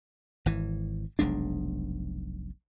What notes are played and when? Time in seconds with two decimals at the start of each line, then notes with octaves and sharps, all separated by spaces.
0.46 G#1 E3
1.19 F1 B1 G#3 D4